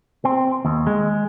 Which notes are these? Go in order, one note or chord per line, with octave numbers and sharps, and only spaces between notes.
C4
D#2
G#3